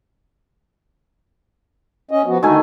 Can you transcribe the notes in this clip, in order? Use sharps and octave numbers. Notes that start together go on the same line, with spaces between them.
C#4 D#5
F3 B3 F#4
D3 D#3 A3 F#4 G#5